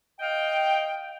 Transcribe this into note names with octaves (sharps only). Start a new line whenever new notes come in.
D#5 F5 G5